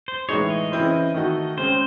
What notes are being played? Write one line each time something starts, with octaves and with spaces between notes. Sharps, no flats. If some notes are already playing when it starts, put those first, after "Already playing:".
C5
A2 E3 G#3 D#4 G#4 C#5
D#5
C#3 E3 C4 E4 C5
D#3 A3 D#4 F#4
C#3 G#3 C4 C5